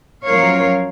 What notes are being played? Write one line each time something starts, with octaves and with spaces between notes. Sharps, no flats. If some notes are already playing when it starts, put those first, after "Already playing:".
F#2 F3 F#3 A#4 C#5 F5